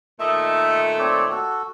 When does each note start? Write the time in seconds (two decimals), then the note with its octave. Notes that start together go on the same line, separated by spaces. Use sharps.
0.20 A#2 D#3 A3 D#5 E5
0.99 C4 C#5 D5
1.31 F#4 A4